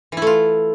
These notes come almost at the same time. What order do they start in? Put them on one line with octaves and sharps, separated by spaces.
E3 E4 A3 F4